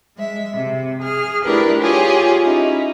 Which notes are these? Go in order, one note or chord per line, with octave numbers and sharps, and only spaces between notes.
G#3 E5
C3
G#4 F6
A3 D4 E4 G4 A#4 B4
F4 G4 G#4 C#5
C#4 D#4 E4